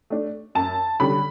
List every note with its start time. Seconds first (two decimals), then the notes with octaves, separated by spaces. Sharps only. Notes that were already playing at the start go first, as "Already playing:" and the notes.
0.10 A3 D4
0.55 F#2 A5
1.00 D3 G3 C#4 B5